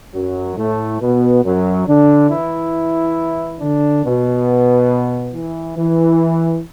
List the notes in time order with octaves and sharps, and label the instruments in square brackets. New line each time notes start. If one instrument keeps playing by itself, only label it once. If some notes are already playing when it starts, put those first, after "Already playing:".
[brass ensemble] F#2 F#3
A2 A3
B2 B3
F#2 F#3
D3 D4
E3 E4
D3 D4
B2 B3
E3
E3